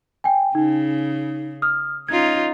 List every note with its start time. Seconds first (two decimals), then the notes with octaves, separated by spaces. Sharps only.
0.24 G5 G#5
0.55 C#3 D#4
1.62 D#6 F6
2.08 C#4 D#4 F4 G#6